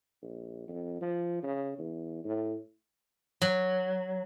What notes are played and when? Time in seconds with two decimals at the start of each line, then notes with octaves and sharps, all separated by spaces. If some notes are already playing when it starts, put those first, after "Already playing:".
0.22 A#1
0.68 F2
1.01 F3
1.43 C#3
1.78 E2
2.24 A2
3.42 F#3